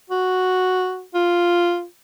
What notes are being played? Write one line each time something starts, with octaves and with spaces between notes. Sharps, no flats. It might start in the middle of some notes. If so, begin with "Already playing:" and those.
F#4
F4